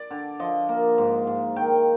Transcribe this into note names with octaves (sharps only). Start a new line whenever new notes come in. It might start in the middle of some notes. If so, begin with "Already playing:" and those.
Already playing: D5
D3
F3 D#5
A#3
G#2
G#2
D#3 G5